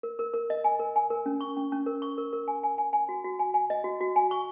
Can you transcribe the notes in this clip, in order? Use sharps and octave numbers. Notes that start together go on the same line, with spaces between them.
A#4
A#4
A#4
D#5
G#5
A#4
G#5
A#4
C#4
C#6
C#4
C#4
A#4
C#6
A#4
A#4
G#5
G#5
G#5
G#5
F#4
F#4
G#5
G#5
D#5
F#4
F#4
G#5
C#6